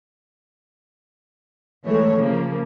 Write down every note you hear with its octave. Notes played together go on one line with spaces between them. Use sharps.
E3 G#3 A3 C#5
C#3 F3 A#3